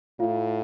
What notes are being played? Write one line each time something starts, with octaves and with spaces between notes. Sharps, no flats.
A2 F4 F5